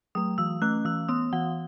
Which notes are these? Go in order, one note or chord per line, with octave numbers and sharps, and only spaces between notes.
F#3 A3 D#6
E3 E6
A3 C#4 F#6
E3 E6
B3 D#6
E3 F#5